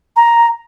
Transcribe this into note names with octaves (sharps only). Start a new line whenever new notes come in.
A#5